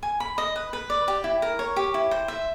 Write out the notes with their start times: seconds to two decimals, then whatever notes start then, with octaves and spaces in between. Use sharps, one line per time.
0.03 G#5
0.20 B5
0.38 D#5
0.56 B4
0.73 B4
0.90 D5
1.08 G4
1.24 E4
1.42 A#4
1.59 C#5
1.76 G4
1.94 E4
2.11 C5
2.28 E5